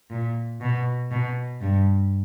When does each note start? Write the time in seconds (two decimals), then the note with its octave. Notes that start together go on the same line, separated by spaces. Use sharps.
0.10 A#2
0.61 B2
1.11 B2
1.61 G2